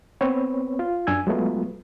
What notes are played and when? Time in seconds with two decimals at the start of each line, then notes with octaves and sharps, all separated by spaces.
0.21 B3 C4 B4 C#5
0.79 F4
1.07 F#2 D4 G#5 E6 G#6
1.27 F#3 G#3 A3 B3 F4